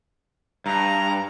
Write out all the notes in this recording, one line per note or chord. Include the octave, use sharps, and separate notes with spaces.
G2 A#5